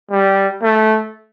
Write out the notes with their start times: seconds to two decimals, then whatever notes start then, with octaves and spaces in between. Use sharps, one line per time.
0.11 G3
0.62 A3